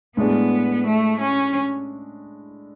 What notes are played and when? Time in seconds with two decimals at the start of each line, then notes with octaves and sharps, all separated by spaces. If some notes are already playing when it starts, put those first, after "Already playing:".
0.17 A2 G#3 B3 D4 G#4
0.87 A3
1.21 C#4